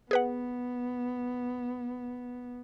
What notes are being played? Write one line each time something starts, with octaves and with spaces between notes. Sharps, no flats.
B3 G#4 B4 F#5